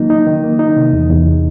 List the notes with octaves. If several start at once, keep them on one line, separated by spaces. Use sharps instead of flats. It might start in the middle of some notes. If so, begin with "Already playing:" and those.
Already playing: D#3 F#3 A#3 D#4
D#4
D#3
A#3
D#4
C3
E2
E2